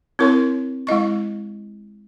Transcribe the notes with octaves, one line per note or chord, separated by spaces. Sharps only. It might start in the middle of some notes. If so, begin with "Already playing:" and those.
C4 E4 A#4 C#5 C6
G#3 E4 D#5 C#6